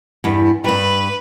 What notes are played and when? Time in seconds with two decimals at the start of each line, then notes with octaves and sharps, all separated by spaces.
0.24 E2 G2
0.64 G2 G3 B4